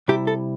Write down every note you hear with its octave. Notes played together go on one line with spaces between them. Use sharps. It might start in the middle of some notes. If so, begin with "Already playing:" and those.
C3 G3 E4 G4
A4